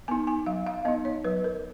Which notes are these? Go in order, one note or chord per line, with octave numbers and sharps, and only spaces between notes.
B3 D#4 G#5
G#5
F#3 F5
F5
B3 D#4 D#5
C#5
F#3 B4
A#4